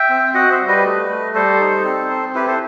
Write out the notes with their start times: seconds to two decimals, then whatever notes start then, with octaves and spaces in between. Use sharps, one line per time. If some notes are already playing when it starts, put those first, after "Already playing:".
Already playing: E5 G5
0.10 C4
0.34 F#4 D#5 F#5
0.51 C5 E5
0.60 G3
0.68 B4 D#5
0.85 A3
1.09 A3
1.34 G3 A4 C5
1.60 D#4
1.84 C4
2.10 C4
2.35 E4 G4 B4
2.47 A4 C5